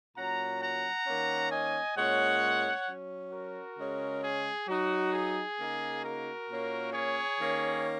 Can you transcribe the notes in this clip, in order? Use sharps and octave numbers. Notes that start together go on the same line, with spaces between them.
A#2 F#3 C#4 F#5 A#5
F#5 A#5
D#3 A#3 C#4
D#5 G#5
A#2 G#3 C#4 C#5 F#5
F#3 C#4
F#4 A#4
C#3 G#3 C#4
G#4
F#3 D#4 F#4
G#4
C#3 A#3 D#4
F#4 A#4
A#2 A#3 C#4
G#4 C#5
D#3 A#3 C#4